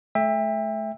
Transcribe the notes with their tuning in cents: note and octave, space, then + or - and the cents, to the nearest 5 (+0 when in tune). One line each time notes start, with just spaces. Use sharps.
A3 -30 E5 +0 G5 +35